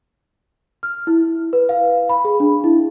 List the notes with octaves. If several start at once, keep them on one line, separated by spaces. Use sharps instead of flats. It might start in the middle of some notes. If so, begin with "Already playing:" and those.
F6
E4
B4
F5
B5
G#4
D4
E4